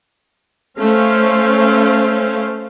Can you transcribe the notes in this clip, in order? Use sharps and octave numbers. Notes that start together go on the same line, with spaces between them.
A3 C#4 C5 F5